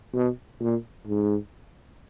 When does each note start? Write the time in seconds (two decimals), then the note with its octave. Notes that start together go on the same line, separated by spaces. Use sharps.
0.14 B2
0.61 A#2
1.07 G#2